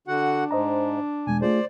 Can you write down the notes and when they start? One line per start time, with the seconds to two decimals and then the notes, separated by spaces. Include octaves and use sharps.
0.08 D3 D4 F#4 F#5
0.51 G#2 C5 D#5 A#5
1.27 E2 B2 G#3 G#5
1.42 A3 F4 G#4 C5 D5